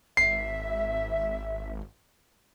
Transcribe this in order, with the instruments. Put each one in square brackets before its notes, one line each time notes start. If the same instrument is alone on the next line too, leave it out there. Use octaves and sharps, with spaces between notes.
[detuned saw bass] G#1 [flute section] E5 [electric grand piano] C7